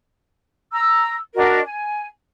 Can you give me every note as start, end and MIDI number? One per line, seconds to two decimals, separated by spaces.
0.71 1.16 82
0.71 1.16 88
1.35 1.59 62
1.35 1.59 66
1.35 1.59 70
1.35 1.59 75
1.63 2.05 80